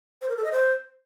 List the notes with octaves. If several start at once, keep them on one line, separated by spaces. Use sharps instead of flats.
C5
A#4
A4
D#5
C5